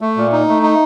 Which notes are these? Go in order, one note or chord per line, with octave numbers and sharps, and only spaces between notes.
A3
A#2
D#4
A3
D#4